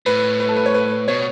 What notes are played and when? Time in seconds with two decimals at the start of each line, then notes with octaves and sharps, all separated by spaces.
0.06 A2 B4
0.40 B4
0.49 A4
0.57 B4
0.66 C#5
0.74 B4
1.08 B2 C#5